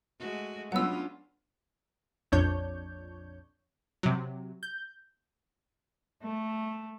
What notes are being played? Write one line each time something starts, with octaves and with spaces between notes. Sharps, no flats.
G#3 A3 F#4
F#3 B3 C#4 D4 F4 F#5 E6
A#1 F2 D4 C#5 G6
C3 F#3
G6
A3